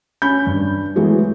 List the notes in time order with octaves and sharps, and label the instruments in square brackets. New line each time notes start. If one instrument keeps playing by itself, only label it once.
[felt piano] C#4 B5 G6
G2
E3 F#3 G#3 A3 B3